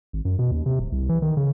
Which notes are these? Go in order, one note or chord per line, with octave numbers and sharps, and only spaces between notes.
G#1
F#2
B2
D#2
C3
D1
C2
E3
D#3
C#3